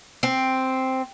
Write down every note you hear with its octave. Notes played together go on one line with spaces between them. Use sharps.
C4